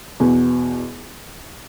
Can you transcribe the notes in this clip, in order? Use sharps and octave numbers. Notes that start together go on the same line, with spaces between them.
E2 B2 B3